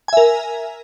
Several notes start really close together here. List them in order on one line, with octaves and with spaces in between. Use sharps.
G#5 E5 A#4